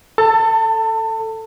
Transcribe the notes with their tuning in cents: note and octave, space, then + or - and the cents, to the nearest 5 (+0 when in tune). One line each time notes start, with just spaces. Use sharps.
A4 +5 A5 +30